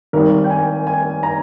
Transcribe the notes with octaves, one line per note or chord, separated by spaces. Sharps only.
G#1 G#2 G3 A#4
G5
G#5
G#5
A#5